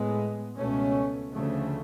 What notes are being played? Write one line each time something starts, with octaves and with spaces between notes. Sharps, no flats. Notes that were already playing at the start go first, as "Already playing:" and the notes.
Already playing: A2 G#3 B3
C#2 B2 A3 C#4
D2 C#3 F3 A3